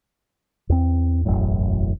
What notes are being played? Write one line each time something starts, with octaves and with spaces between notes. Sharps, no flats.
E2 C4
E1 A1 F#2 A2